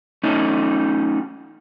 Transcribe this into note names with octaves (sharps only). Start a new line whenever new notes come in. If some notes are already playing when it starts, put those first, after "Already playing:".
A3 C#4 D#4